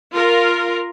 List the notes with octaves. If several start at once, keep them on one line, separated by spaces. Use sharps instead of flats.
F4 A#4